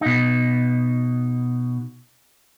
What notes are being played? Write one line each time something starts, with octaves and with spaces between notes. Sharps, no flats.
B2 D#4